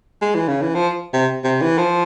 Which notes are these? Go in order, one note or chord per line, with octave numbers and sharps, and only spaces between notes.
G#3
E3
C#3
E3
F3
C3
C3
E3
F3